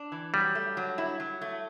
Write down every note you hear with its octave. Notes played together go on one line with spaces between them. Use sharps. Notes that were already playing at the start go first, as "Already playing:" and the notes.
Already playing: D4
E3
F#3 G3
A3
F#3
E4
F#3
A3